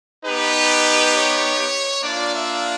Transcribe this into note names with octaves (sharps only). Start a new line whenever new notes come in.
B3 D#4 G4 B4
C#5
A#3 D4 F4 D5
E5